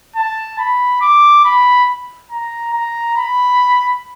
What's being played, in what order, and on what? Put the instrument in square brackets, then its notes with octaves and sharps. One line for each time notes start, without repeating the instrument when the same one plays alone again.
[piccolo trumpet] A5
B5
D6
B5
A#5
A#5
B5